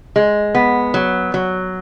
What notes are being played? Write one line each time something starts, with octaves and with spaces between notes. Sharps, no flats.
G#3
B3
F#3
F#3